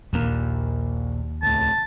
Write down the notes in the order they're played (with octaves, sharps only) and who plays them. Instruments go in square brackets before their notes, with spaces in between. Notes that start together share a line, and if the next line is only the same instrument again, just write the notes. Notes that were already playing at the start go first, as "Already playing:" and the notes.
[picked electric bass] A#1 A#2 A#3 [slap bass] D#2
[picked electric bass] C#2 A2 [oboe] A5